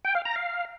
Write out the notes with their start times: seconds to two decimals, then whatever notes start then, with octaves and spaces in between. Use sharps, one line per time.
0.05 G5
0.15 F5
0.25 A#5
0.36 F5